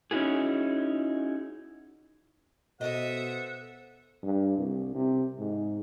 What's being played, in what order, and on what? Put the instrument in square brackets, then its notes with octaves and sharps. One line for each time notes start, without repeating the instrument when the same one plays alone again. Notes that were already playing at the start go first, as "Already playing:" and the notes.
[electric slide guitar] C#4 D#4 E4 F#4 G#4
[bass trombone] B2 [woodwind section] A4 C5 F#5 [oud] D#5 [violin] E5 D#6
[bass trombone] G2
C2
C3
G#2